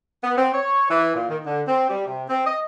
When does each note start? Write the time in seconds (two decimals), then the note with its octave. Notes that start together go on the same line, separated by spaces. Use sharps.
0.24 B3
0.38 C4
0.54 C#5
0.90 E3
1.15 A#2
1.29 D#3
1.45 D3
1.68 C4
1.89 G3
2.07 C3
2.29 C4
2.46 D#5